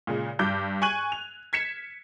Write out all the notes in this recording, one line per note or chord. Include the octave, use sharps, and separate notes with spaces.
A#2 C#3 G#3
G2 D6 G6
G#5 C#6 F#6 G#6 D#7 F#7
F7
G#6 B6 C#7 E7